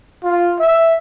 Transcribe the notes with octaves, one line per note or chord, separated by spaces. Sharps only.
F4
E5